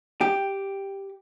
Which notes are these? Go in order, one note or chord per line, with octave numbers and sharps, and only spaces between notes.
G4